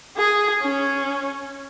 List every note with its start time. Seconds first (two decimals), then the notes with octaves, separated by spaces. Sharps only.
0.17 G#4
0.62 C#4